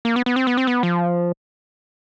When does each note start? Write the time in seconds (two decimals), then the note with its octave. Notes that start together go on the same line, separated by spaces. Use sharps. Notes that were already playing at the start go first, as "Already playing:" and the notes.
0.05 A#3
0.16 B3
0.26 B3
0.36 C4
0.47 B3
0.57 C4
0.67 B3
0.83 F3